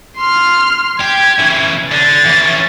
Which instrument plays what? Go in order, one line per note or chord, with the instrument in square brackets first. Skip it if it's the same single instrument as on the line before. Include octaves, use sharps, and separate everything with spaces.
[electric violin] C6 F6
[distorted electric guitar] G4 [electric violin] G#6
[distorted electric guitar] C#3 E3
[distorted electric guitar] D3 [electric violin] A6
[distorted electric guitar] E3 C#4